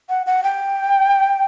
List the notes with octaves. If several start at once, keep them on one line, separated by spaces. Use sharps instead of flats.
F#5
F#5
G5